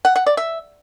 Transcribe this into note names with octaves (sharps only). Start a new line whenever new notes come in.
F#5
F#5
D5
E5